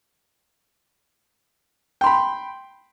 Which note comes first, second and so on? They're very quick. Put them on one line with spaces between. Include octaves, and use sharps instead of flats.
G5 C6 B5